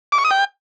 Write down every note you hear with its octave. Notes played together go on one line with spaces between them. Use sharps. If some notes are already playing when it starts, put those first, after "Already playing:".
D6
C#6
D#6
G5